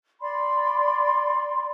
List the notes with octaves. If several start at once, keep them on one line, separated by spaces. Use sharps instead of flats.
D5 B5 C6